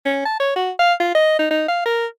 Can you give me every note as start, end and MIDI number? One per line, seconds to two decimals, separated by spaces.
0.06 0.22 61
0.25 0.37 81
0.40 0.56 73
0.56 0.71 66
0.79 0.93 77
1.00 1.12 65
1.15 1.35 75
1.39 1.49 63
1.51 1.64 63
1.68 1.86 77
1.86 2.06 70